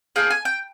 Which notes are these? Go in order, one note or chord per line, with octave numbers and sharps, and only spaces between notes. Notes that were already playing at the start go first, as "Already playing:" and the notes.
A#3 D4 F4 G#4 G5
G#5
G5